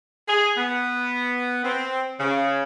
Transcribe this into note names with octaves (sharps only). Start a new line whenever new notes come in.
G#4
B3
C4
C#3